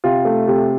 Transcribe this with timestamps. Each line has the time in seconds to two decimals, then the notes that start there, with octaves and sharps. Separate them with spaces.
0.04 C3 F4
0.25 A3
0.48 C3